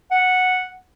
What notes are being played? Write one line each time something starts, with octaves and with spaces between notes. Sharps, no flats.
F#5